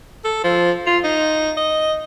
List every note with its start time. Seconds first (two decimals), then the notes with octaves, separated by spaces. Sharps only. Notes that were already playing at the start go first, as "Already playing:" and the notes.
0.25 A4
0.44 F3
0.87 F4
1.04 D#4
1.57 D#5